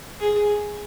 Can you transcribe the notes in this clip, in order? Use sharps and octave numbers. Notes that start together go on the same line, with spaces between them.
G#4